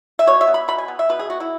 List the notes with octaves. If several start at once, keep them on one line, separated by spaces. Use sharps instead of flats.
E5
B2 C#5
E5
B3
B5
B2 B5
G#5
B3
E5
B2 B4
G#4
B3 F#4
E4